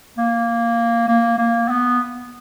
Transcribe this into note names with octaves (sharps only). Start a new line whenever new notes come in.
A#3
A#3
A#3
B3